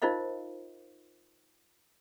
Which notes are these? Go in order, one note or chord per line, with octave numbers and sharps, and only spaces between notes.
D#4 F4 A#4 C5 D#5 F5